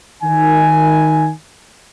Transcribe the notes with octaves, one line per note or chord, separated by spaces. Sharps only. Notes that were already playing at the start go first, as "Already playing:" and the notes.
D#3 G#5